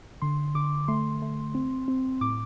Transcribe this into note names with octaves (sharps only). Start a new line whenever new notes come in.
D3 C6
D3 D6
A3 C6
A3
C4
C4
A2 D6